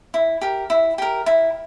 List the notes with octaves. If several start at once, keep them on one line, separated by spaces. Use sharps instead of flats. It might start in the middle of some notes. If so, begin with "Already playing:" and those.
E4
G4 A#4
E4
G4 A#4
E4